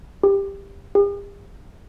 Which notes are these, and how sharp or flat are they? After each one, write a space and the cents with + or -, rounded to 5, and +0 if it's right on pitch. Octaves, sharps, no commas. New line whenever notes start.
G4 +15
G4 +45